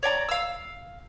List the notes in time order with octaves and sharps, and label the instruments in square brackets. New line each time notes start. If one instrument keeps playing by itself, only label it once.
[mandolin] C#5 D5 G#5 A#5
F5 E6